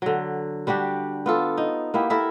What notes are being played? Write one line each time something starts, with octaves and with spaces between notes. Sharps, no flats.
D3 F#3
G3 D4 F#4 G4
B3 F4 A4
D#4
A#3 B3 E4 G4
E4 A4 A#4 E5